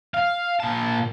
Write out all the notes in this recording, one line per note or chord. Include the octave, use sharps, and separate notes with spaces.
F5
A#2 A5